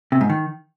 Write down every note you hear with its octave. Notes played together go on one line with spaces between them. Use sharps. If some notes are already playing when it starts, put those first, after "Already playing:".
C3
G#2
D#3